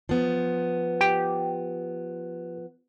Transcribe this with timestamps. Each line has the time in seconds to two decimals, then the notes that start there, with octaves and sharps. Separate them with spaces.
0.09 F3 B3
1.01 G4 G5